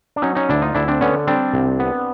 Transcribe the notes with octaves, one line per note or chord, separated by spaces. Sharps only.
D4
F#3 C#4 D#4
C#4 D#4
D2 D4 E4
D#4 F4
D2 D4 E4
C4 D4
D3 B3 C#4
G3 C4 D4
C2
B3